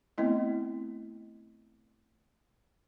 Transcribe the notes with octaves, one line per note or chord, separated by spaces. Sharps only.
A3 B3 C4 E4 D#5